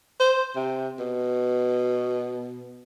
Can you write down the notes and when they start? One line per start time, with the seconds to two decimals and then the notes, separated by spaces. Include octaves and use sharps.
0.20 C5
0.56 C3
0.99 B2